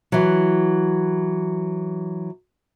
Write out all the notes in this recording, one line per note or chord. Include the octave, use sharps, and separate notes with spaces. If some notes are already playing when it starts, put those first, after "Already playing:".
E3 F#3